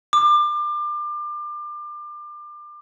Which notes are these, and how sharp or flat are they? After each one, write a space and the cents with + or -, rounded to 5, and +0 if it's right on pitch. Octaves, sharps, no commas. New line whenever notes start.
D6 +30